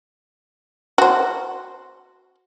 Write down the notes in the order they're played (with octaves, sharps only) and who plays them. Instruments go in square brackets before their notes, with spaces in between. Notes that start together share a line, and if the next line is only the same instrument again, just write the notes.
[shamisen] F#4 C5